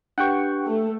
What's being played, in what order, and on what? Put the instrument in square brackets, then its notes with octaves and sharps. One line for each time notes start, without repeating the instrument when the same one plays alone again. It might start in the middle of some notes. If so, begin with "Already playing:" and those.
[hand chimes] D4 G4 B4 [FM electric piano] F#5 G5 C#6
[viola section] A3